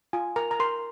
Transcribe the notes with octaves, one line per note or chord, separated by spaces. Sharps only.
F4 G#5
A#4 A#5
A#5
A#4 C6